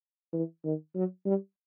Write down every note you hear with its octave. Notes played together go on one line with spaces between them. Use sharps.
E3
D#3
F#3
G3